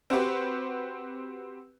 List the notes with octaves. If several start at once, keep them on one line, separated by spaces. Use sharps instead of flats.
C4 F#4 G4 B4